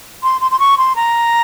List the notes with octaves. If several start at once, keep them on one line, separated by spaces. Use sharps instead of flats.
C6
C6
C6
C#6
C6
A#5